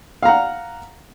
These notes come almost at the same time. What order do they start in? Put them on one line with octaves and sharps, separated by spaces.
F5 A#5 F#5